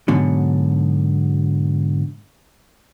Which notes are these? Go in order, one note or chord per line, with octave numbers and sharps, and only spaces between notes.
G#2 B2 D3 F#3